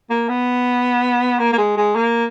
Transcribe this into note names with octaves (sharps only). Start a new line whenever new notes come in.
A#3
B3
A#3
A#3
G#3
G#3
A#3